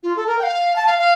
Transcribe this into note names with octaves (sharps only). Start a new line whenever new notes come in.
F4
A4
A#4
G5
F5
A5
F5
F5